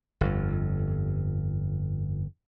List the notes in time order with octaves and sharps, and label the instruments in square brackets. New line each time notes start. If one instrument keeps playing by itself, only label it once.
[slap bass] G1 F2